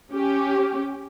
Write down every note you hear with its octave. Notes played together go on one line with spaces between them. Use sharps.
C#4 G4